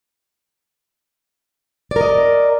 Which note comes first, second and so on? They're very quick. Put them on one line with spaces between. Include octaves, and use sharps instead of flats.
D5 A#4 D#5